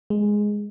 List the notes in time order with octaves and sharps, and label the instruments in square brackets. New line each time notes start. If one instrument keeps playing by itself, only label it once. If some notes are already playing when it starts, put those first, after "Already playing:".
[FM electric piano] G#3